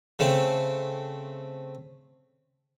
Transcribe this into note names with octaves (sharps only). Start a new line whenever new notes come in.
C#3 A3 C4